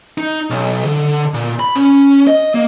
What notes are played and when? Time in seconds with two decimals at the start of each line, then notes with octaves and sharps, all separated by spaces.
0.18 D#4
0.50 B1
0.85 D3
1.34 A#2
1.60 B5
1.75 C#4
2.27 D#5
2.54 A#3